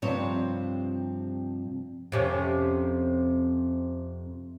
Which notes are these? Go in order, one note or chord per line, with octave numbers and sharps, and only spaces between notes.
G2 C3 F3 C4 C#5
F2 C3 C#4